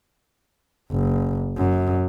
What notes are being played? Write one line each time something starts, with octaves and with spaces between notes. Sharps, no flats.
F#1
F#2